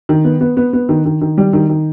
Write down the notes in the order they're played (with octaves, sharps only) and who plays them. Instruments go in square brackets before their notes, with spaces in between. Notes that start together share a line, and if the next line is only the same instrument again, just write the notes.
[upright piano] D#3
B3
B3
B3
B3
D#3
D#3
D#3
G3
D#3
D#3